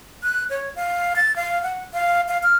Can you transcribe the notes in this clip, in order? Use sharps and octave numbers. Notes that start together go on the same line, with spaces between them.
F#6
C#5
F5
A6
F5
F#5
F5
F5
F6